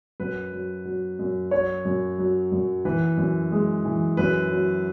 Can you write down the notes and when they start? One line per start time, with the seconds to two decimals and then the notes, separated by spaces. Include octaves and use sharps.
0.20 F#2 B4
0.52 F#3
0.85 F#3
1.19 F#2
1.51 F#3 C#5
1.85 F#2
2.18 F#3
2.52 F#2
2.85 E3 B4
3.18 F#2
3.52 G#3
3.85 E3
4.17 F#2 B4
4.51 F#3